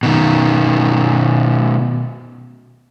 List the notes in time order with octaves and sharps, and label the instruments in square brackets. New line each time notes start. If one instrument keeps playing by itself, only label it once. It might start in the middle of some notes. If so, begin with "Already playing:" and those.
[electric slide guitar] B2 D#3